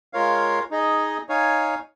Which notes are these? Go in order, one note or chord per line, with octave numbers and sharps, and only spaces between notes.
G#3 F4 A#4 C#5 F5
D#4 G#4 D#5
D#4 C#5 F5 G#5